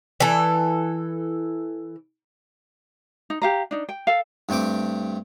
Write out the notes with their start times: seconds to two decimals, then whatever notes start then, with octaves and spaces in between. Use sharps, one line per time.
0.20 E3 A4
3.30 D#4
3.42 G4 F5 A#5
3.71 D4 D#4
3.89 G5
4.07 A4 F5
4.49 G2 A3 C4 G5 D6